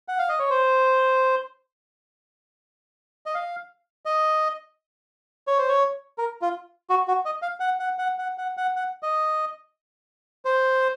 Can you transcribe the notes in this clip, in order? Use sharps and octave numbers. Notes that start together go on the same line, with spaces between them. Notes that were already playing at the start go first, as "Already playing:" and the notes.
F#5
F5
D#5
C#5
C5
D#5
F5
D#5
C#5
C5
C#5
A#4
F4
F#4
F#4
D#5
F5
F#5
F#5
F#5
F#5
F#5
F#5
F#5
D#5
C5